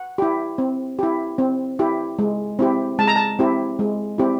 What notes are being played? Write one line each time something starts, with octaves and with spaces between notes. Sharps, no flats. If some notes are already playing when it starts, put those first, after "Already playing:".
Already playing: F#5
E4 G4
C4
E4 G4
C4
E4 G4
G#3
C4 E4 G4
G#3 A5
A#5
A5
C4 E4 G4
G#3
C4 E4 G4